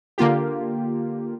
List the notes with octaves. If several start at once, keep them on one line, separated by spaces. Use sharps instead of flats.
D3 A#3 F4 G4